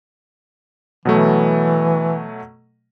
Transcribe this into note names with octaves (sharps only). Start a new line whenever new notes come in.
B2 E3 F#3 A3